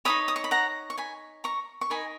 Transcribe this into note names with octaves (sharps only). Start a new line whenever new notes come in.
D#4 A#4 C#5 B5 D#6
D#6
C#6
B5
F#5 A#5
C#6
G#5 B5
A#5 C#6
C#6
D#4 A#4 D#5 G#5 B5